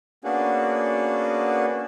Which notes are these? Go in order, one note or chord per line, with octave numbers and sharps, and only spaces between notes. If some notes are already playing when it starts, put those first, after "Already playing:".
A#3 B3 C#4 D4 F#4 G#4